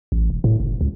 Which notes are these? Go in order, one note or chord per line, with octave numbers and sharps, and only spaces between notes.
A1
E1
A2
F#1
C#2